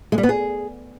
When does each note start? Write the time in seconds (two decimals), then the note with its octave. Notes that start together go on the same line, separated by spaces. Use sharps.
0.12 G#3
0.18 G3
0.23 B3
0.29 G#4